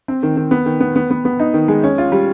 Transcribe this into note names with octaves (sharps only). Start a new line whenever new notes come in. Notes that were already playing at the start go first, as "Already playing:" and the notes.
C4
D#3
D#3
B3
D#3
B3
B3
B3
B3
D#4
D#3
G#3
C#4
F4
G3